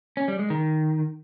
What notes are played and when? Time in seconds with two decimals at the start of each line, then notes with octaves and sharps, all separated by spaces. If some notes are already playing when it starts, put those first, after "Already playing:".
0.17 C#4
0.28 G3
0.39 G#3
0.50 D#3